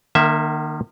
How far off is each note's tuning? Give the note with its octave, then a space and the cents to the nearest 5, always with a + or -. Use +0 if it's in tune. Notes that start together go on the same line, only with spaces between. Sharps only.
D#3 -40 A#3 +0 E5 -5